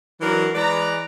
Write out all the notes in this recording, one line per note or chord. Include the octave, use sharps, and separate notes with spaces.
E3 F#3 D4 A#4
E3 G#3 B4 D5 A#5